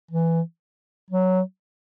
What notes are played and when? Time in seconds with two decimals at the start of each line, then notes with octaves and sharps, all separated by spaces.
0.11 E3
1.11 F#3